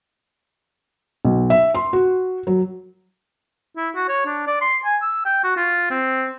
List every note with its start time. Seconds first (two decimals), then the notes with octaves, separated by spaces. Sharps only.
1.25 B1
1.50 E5
1.75 C6
1.93 F#4
2.47 F#3
3.77 E4
3.95 F#4
4.09 C#5
4.26 D4
4.47 D5
4.61 C6
4.85 G#5
5.02 E6
5.26 G5
5.44 F#4
5.56 F4
5.91 C4